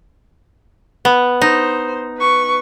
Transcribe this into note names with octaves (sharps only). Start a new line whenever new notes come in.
B3
D#4 C5
B4 C#6